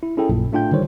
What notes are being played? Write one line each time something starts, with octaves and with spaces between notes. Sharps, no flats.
E4
C#4 E4 G#4 A4 G5
A#1 F#2 A#2
A2 A3 D4 F4 G5 G6
D3 D#3 G3 C5 C#5